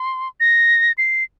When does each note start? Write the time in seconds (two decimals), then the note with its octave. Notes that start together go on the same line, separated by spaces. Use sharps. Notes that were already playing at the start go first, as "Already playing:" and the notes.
Already playing: C6
0.40 A#6
0.98 C7